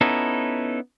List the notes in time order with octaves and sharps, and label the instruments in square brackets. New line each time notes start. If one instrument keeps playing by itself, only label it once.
[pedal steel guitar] B3 C#4 D#4 E4 A4